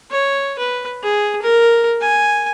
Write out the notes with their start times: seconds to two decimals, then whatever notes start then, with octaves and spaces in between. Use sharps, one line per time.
0.11 C#5
0.59 B4
1.03 G#4
1.42 A#4
2.01 G#5